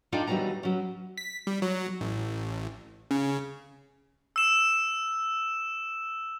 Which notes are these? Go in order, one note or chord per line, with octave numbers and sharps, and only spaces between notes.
D4 D#4 F4 A4 D5 G5
D#2 E3 F#3 G3 B3 A#5
F#3 C#4
B6
G3
F#3
A1
C#3
E6 E7